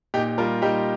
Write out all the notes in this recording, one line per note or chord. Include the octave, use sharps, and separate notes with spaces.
A#2 D#4 G4
G3 F4 A#4
G3 D#4 G4